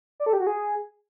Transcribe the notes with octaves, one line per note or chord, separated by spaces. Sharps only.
D5
A4
G4
F#4
G#4